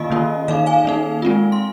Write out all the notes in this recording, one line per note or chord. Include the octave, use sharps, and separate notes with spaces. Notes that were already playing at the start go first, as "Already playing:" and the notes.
Already playing: D#3 A#3 F4 D#5 F5
D#3 A#3 C#4 F4
D#3 A#3 D#4 F5
F5 G#5
D#3 A#3 D#4
G#3 C4 F4
C6